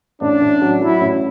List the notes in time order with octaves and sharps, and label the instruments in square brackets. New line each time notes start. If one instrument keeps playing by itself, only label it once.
[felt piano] A1 [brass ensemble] D4
[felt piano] A1
F#3
[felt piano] F#3 [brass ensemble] E4
[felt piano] A1